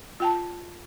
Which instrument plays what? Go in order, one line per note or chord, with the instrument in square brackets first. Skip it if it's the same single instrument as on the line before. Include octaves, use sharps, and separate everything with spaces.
[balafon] F4 G5 A5